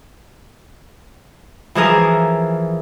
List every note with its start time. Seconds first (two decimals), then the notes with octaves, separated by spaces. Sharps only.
1.75 E3 F3 G#4 A#4